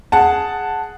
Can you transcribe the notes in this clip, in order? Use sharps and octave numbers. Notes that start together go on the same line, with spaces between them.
G#4 F#5 A5